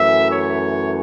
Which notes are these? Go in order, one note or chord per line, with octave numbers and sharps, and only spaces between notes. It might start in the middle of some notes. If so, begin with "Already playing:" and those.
Already playing: F#2 E3 A3 E5
C#5